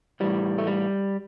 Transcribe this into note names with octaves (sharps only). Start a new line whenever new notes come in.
A2 E3 G3
A3
G3